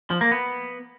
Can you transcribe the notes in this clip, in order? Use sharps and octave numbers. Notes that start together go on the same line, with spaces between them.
F3
A#3
B3